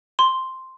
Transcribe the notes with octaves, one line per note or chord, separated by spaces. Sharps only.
C6